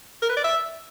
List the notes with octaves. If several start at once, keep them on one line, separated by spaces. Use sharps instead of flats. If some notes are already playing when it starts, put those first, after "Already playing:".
A#4
B4
D5
E5